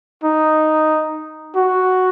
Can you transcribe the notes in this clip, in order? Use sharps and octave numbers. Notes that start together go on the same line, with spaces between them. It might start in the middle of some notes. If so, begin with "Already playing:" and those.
D#4
F#4